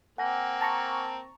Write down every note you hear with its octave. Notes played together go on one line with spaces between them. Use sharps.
A#3 C4 F#5 G#5 A#6
A5 A#5 C#6